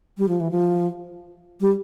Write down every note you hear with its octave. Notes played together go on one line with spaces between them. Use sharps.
G3
F3
E3
F3
G3